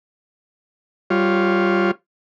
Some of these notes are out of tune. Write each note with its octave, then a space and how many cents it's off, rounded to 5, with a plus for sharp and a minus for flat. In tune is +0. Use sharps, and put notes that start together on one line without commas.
G3 -15 F4 +0 C#5 -20